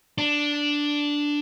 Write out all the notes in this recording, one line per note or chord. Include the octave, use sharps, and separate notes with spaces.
D4